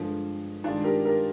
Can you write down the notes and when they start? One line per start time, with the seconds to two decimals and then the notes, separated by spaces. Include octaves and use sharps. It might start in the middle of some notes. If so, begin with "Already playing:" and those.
Already playing: G2 D3 F3 G#3
0.64 G2 D#3 G#3 D4 F4
0.84 G4 A#4
1.05 G4 A#4